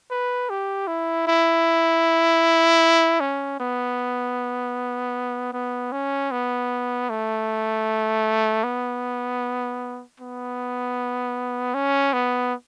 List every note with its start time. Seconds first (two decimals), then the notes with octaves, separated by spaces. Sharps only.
0.11 B4
0.49 G4
0.87 E4
1.27 E4
3.20 C#4
3.60 B3
5.53 B3
5.92 C#4
6.31 B3
7.10 A3
8.64 B3
10.20 B3
11.74 C#4
12.13 B3